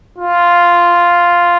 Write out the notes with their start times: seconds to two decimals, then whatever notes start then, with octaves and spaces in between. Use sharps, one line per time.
0.18 F4